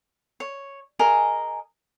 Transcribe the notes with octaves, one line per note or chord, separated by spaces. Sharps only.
C#5
G#4 A#4 D#5 G#5